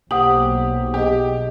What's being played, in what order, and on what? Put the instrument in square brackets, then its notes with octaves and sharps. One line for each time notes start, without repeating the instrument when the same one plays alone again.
[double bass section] B1 [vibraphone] A#3 C5 [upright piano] G4 [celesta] F#5 D#6 F#7
[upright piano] G4 [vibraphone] G#4 D#5